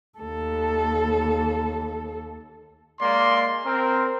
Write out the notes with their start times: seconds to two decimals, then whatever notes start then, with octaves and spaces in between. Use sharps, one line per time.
0.19 D#2 A4
3.01 G#3 A#3 D5 C6
3.64 C4 A#4